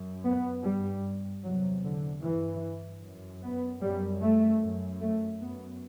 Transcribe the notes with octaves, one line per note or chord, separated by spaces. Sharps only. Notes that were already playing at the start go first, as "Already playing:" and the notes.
Already playing: F#2
B3
G2 G3
E2 C3 F#3
D3
G2 E3
F#2
B3
F#2 G3
A3
F#2
A3
F#2 B3